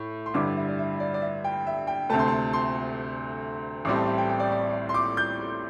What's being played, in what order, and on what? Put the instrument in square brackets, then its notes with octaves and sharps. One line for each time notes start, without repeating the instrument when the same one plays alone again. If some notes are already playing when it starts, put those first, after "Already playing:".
Already playing: [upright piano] A2
[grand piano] C6
[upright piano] G2 D3 G3 E4 [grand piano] D6
[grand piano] D5
E5
D5
E5
E5
D5
D5
E5
G5
E5
G5
[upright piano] D2 C3 A3 [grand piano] A5
[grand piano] C6
A5
C6
[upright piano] A1 A2 G3 C4 [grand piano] D6
[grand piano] A5
E5
G5
G5
D5
D5
C6
D6
G6